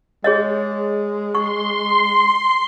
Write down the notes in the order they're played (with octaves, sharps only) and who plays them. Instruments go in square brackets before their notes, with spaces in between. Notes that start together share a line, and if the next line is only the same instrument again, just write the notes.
[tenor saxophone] G#3 [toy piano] G#4 C#5 D#5
[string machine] C6 [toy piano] C#6